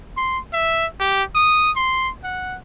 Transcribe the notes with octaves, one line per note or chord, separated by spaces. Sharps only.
C6
E5
G4
D#6
C6
F#5